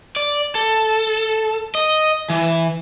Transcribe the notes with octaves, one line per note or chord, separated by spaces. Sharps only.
D5
A4
D#5
E3